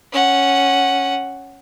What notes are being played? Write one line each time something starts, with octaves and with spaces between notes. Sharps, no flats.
C#4 F#5